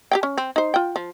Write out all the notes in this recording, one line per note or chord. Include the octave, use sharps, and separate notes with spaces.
G4 F5 G5
C#4
C4
D#4 C5
F4 G5
F3